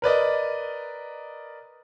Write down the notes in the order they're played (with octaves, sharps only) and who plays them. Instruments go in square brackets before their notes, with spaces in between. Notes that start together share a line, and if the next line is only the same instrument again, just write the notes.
[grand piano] A#4 B4 D5 D#5